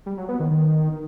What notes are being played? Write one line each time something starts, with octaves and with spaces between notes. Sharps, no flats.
G3
F#3
B3
D#3
D#3